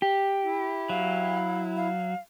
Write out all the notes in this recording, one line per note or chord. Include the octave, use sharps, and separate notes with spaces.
G4
E4
F#3 F5
F5